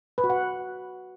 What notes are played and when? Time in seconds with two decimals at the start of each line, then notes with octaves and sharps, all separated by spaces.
0.18 B4
0.24 F#4
0.30 F#5